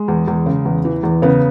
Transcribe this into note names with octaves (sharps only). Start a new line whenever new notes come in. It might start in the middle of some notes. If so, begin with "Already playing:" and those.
Already playing: G#3
E2
E2
C#3
E2
E3
E2
C#3 B3